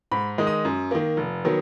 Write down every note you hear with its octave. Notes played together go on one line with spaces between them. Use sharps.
G#2 B5
D#3 G#3 D#4
D#6
F#2
D#3 A#3
F1
D#3 F#3 B3